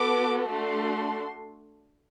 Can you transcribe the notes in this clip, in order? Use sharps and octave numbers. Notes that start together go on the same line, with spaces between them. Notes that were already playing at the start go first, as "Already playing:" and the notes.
Already playing: B3 F#4 A4 D6
A3 D4 F#4 A4 C6